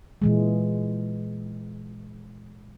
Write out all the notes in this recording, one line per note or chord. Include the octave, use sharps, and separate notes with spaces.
A#2 E3 G#3